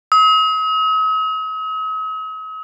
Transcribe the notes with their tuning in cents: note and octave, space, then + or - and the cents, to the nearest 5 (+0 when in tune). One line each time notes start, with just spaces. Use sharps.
D#6 +45